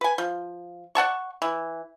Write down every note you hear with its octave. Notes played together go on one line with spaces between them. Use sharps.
B4 G#5
F3
D5 F#5 A5 C#6
E3